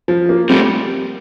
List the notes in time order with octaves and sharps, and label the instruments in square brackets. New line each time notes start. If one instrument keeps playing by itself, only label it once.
[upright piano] F3
A#3
[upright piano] G3 [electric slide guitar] A3 C4